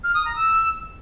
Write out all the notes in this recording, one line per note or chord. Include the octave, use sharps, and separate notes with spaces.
F6
D#6
A#5
E6